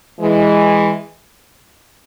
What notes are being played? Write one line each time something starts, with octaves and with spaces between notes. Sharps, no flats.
E3 G#3